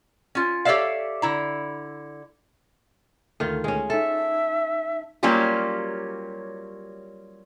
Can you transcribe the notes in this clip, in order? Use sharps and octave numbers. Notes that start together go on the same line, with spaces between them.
C#4 F4
G4 A4 C#5 D5 E5 F5
D3 E4 A#5
D2 D#3 A3 F4 A4
G#3 C#4
D#4 A4 E5 A5
F#3 G3 A#3 C#4 F4 G4